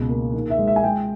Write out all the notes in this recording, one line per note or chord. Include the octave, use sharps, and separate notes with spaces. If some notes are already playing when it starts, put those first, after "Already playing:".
Already playing: C#2 B2
A#3
D#3
E5
G#3
E5
G#5
G#3 G5